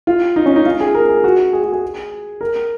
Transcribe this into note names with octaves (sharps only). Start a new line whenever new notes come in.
F4
D#4
C#4
D#4
F4
G#4
A#4
G#4
F#4
G#4
F#4
G#4
A#4